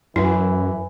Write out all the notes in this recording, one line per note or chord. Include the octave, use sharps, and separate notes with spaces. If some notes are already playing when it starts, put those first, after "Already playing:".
F#2 E3 E4